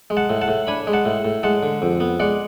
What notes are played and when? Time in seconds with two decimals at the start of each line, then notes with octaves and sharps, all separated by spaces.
0.10 G#3
0.17 F#5 A5
0.30 A2
0.42 F#5 A5
0.48 A2
0.67 D4 G#5 B5
0.87 G#3
0.93 F#5 A5
1.05 A2
1.25 A2
1.43 G#3 F#5 A5
1.63 D3
1.82 F2
2.00 B3
2.20 G#3 D5 F#5